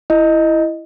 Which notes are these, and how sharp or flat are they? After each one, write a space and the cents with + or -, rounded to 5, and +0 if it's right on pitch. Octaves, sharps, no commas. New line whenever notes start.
E4 +10 D#5 +0